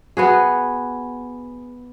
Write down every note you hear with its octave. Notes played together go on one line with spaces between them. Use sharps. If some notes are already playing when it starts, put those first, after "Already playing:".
B3 F#4 G#4